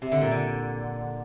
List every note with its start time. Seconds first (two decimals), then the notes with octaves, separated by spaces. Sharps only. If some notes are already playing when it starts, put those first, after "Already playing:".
0.02 C3
0.12 D3
0.21 A#2
0.31 D3